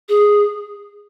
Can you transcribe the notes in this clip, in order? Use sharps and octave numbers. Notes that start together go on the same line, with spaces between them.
G#4